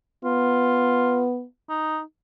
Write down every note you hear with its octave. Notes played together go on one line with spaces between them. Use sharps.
B3 F4
D#4